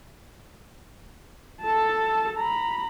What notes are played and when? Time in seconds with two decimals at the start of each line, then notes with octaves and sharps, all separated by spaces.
1.62 A4 A5
2.38 A#5 B5